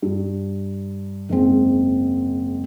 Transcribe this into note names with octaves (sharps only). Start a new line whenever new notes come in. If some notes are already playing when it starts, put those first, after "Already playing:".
G2
F#1 G#2 C4